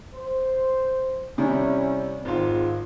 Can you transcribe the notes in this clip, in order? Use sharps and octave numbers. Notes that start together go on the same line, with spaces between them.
C5
C3 G3 C#4 E4
G#1 C4 F4